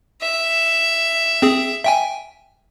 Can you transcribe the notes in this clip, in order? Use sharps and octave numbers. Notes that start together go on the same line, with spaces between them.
E5
C4 G#4
E5 G5 G#5